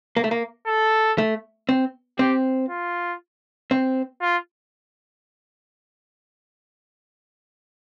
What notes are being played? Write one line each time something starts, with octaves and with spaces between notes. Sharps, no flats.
A#3
A3
A#3
A4
A3
C4
C4 G4
F4
C4
F4